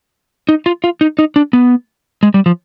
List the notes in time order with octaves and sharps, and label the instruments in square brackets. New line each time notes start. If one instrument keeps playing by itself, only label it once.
[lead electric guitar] D#4
F4
F4
D#4
D#4
D4
B3
G#3
G3
F3